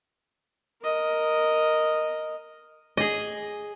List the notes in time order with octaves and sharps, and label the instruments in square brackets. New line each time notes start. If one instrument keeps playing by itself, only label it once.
[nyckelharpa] A#4 D#5
[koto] G#4 D#5